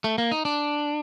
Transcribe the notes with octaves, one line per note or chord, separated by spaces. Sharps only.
A3
A#3
D#4
D4